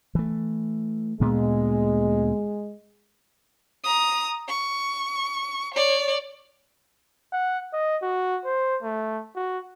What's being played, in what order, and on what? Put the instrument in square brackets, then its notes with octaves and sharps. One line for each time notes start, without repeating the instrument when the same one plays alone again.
[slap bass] E3 A3
[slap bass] D2 A#2 B3 [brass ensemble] G#3
[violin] A#5 D#6
C#6
C#5 D5
[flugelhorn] F#5
D#5
F#4
C5
A3
F#4